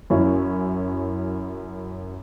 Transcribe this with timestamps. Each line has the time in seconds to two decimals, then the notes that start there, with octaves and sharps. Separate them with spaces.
0.10 F#2 C#4 E4